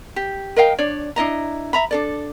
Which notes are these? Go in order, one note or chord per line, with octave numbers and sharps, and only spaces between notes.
G4
A#4 D#5 F5 G5
D4 C#5 D5
D4 E4 D#5 A#5
E5 A#5 B5
D4 A4 D5